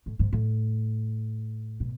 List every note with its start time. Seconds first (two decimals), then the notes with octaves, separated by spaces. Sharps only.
0.06 A2
0.19 G#2
0.33 A2
1.80 B2